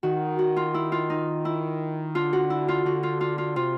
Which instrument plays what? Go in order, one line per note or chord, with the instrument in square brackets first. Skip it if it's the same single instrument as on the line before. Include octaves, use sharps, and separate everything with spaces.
[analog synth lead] D#3 [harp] F#4
[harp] F#4
F4
E4
F4
D#4
E4
[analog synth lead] D3 [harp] F4
[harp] F#4
E4
F4
[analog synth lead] D3 [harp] F#4
[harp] F4
F4
F4
[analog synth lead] C3 [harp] F4